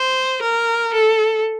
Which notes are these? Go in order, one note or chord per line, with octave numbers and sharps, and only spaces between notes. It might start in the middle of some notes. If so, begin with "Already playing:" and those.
Already playing: C5
A#4
A4